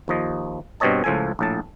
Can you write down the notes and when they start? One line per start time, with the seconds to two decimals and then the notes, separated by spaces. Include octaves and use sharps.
0.08 D#2 F3 D#5
0.80 G2 B2 C4 C#5 D#5 A5
1.04 C#2 A2 F3 A4 G#5
1.39 A#1 A2 A5